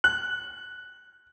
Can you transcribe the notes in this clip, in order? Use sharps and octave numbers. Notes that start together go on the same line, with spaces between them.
F#6